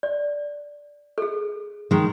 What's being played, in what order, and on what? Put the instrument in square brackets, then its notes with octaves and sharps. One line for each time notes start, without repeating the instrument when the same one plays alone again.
[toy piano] D5
G#4 A4
[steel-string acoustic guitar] D#3 G#3